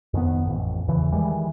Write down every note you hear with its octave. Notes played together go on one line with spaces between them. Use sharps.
F2 D#3 B3
A1 F2
E2 C#3 E3
D#3 E3 G3 G#3